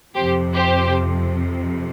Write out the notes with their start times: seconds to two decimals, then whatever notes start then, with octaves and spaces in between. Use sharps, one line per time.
0.14 F2 C3 F3 G4 C5
0.54 G4 C5